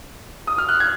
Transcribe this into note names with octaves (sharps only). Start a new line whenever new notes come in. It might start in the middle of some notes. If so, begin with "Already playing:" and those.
D#6
F6
F#6
G#6